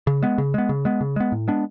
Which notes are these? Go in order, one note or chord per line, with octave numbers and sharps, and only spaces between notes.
C#3
G#3 B3
C#3
G#3 B3
C#3
G#3 B3
C#3
G#3 B3
A2
G#3 B3 D4